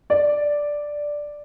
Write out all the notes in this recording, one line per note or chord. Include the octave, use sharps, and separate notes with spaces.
D5